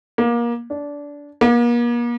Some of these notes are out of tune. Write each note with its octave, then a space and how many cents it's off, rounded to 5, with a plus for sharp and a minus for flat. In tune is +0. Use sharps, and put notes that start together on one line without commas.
A#3 +25
D4 -20
A#3 +40